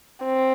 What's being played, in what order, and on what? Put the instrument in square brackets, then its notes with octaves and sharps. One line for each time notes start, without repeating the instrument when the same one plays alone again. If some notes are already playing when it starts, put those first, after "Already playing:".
[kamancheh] C4